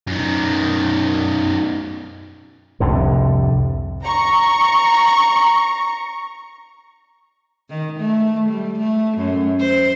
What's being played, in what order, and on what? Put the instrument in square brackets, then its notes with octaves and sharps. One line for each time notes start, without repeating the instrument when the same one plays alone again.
[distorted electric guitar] F#2 D#3
[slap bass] C2 F2 A2 D3
[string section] A#5 C#6
[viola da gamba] D#3
A3
G3
A3
F#2
C5